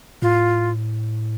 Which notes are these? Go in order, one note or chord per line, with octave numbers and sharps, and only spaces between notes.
A2 F4